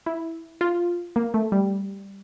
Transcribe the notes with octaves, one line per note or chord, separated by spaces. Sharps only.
E4
F4
A#3
A3
G3